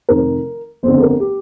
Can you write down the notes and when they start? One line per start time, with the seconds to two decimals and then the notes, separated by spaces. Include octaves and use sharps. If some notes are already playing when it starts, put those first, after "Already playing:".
0.09 F1 F2 D#3 A#4
0.83 G1 F2 D3 C5
0.97 A4
1.02 A#4
1.20 G4